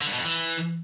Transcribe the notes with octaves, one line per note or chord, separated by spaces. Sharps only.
D3
G2
B2
F2
E3